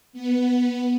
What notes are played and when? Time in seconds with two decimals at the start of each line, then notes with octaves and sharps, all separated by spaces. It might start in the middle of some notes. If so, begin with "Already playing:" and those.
0.13 B3